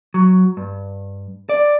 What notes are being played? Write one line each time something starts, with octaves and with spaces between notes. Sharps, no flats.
F#3
G2
D5